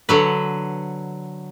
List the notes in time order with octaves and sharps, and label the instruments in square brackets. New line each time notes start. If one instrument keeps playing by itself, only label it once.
[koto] D3 F#3 B4